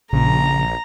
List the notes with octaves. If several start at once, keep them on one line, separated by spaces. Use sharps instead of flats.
A#1 C#3 A#5